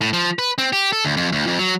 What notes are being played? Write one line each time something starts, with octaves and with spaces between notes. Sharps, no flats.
A2
F3
B4
C4
G4
A4
D2
F2
D2
F2
F#3